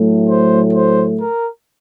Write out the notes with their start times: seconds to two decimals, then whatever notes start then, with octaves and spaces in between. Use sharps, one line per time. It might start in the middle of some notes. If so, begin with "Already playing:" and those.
Already playing: A2 F#3 A3
0.27 C5
0.72 C5
1.17 A#4